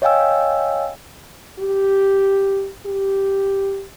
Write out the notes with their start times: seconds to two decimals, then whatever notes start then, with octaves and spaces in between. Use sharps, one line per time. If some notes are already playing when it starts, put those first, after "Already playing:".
0.02 C#5 D#5 F5 G5 G#5 E6
1.59 G4
2.86 G4